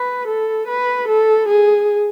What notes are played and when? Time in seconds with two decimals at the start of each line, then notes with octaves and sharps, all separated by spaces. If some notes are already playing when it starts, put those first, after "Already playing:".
Already playing: B4
0.27 A4
0.67 B4
1.08 A4
1.48 G#4